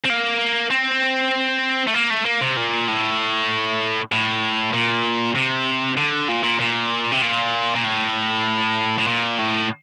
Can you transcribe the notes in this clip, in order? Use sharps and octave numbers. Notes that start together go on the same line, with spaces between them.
C4
A#3
C4
A3
A#3
A3
A#3
C3
A#2
A2
A2
A#2
C3
D3
A#2
A#2
A#2
C3
A#2
A#2
A2
A2
A#2
A2